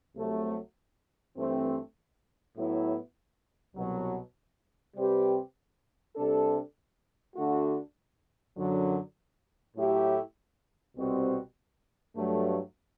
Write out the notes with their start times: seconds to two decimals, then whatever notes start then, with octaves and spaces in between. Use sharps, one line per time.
0.16 C2 C3 F#3 A3
1.36 G2 E3 A3 C4
2.56 A2 F#3 B3 E4
3.76 C2 B2 F#3
4.96 C3 G3 C4 G4 B4
6.16 C3 G3 D4 A4
7.36 D3 A3 D4 F#4
8.57 F#2 D3 F#3
9.76 A2 F#3 A3 E4 G4
10.96 C2 B2 G3 C4 F#4
12.16 G2 F#3 A3